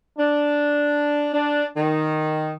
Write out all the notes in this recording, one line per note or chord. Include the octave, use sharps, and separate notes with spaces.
D4
D4
D#3